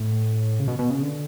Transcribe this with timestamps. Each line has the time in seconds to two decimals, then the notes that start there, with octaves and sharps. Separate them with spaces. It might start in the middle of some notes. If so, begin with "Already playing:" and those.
Already playing: A2
0.60 C#3
0.68 B2
0.79 B2
0.90 C#3
1.02 D3